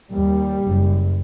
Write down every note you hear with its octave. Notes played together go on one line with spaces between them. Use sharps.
D#2 G3
F#1 F#2